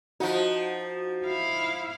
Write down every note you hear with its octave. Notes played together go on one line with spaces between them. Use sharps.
F3 D#4 F#4 F#5
E4 F5